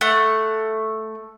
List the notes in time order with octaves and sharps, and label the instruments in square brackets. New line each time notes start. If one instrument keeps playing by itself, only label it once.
[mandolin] A3 F#5